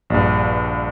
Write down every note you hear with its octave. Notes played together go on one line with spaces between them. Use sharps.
A#1 G2